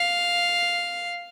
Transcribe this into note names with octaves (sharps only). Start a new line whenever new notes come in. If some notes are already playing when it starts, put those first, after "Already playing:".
Already playing: F5